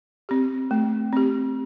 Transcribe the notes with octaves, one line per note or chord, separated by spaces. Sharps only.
C4 G4
A3
C4 G4